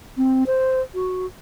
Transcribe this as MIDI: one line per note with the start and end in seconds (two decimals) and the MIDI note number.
0.17 0.44 60
0.47 0.81 72
0.94 1.26 66